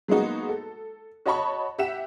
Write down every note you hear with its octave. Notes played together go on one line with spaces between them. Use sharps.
F#3 G#3 A#3 B3 D#4 F#4
A4
F#4 C#5 D#5 A5 B5 C#6
G4 E5 F#5 E7